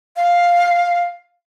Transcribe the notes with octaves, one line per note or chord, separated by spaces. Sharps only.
F5